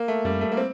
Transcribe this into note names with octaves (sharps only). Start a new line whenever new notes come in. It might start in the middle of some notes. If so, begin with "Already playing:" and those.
Already playing: A#3
A3
F#2 G3
A3
A#3
C4